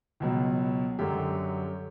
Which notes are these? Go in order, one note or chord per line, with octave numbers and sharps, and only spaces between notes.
C#2 B2 F#3
F#2 D3 F#3 G4